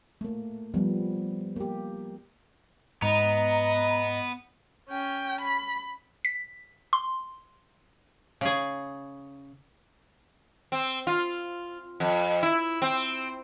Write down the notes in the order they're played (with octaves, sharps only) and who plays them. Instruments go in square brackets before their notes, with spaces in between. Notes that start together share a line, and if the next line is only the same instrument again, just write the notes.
[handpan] A3 A#3
F3 G3 B3
A#3 G4
[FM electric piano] G#2 [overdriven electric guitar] B3 [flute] D#5 [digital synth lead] A#5
[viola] C#4 G5
B5
[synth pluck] B6
C6
[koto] C#3 G#4
[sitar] C4
F4
F2
E4
C4